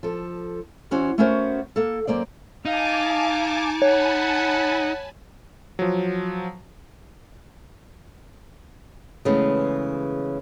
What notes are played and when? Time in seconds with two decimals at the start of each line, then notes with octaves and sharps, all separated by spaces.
0.03 F3 A4
0.91 E2 E3 C#4 F#4 C5
1.18 A3 B3 C#4 F#4 A#4 C5
1.76 A#3 A4
2.07 F#2 A#3 C5 D5
2.65 D#4 F5 G#5 A5 D6
3.82 C#5 F#5 G#5 A5 B5
5.79 F3 F#3
9.25 C#3 E3 G#3 A3 B3